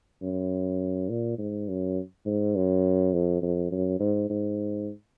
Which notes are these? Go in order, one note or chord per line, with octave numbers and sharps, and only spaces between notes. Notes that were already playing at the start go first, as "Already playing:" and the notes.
F#2
A#2
G#2
F#2
G#2
F#2
F2
F2
F#2
G#2
G#2